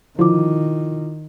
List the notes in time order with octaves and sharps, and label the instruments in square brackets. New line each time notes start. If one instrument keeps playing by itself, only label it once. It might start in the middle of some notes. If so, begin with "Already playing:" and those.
[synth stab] D3 F3 [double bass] D#3 [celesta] E4 F4 D6